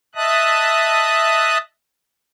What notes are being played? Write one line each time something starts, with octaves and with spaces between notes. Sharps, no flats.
D#5 E5 A5 D#6 F#6